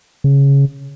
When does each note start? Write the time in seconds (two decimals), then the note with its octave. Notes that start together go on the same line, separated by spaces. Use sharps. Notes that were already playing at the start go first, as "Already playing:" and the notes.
0.24 C#3